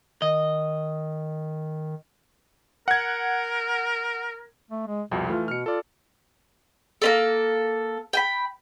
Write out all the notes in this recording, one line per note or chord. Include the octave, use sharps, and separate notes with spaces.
D#3 D#5
A#4 F#5 G#6
A3
G#3
C2 F2 B2
E3 A3 F4
B2 F6 C#7
F4 A4 D5
A#3 C#4 A4
G5 G#5 B5